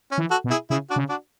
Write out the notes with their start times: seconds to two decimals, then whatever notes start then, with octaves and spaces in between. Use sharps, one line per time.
0.12 C#4
0.18 E3
0.31 F#4 A4
0.44 B2
0.51 E4 G#4
0.70 C#3 E4 G#4
0.90 D4 F#4
0.96 C#3
1.09 D4 F#4